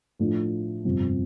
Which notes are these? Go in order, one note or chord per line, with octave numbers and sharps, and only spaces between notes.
A2 F3 A3 D4
G1 F2 C3 F3 C4